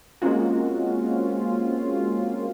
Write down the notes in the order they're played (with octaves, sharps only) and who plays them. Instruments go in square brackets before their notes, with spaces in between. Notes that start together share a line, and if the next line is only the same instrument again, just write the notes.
[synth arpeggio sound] G#3 A#3 C4 C#4 F4 F#4